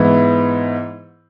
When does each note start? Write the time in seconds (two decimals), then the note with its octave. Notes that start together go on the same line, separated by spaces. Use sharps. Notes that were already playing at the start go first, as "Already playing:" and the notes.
Already playing: G#2 E3 B3 E4